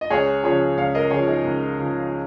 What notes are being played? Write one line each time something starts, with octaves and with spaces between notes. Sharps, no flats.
D#5
C#2 G#4 C#5
C#3 F3 G#4 C#5
C#2 C#5 F5
A#4 D#5
C#3 F3 G#4 C#5
D#4 G#4
C#2
C#3 F3